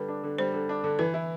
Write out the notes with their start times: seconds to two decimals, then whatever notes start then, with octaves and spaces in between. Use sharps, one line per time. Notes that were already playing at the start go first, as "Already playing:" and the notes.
Already playing: D3 G3 B4
0.08 D4
0.24 D3
0.39 G3 C5
0.54 D3
0.69 D4
0.84 D3
0.99 E3 B4
1.14 E4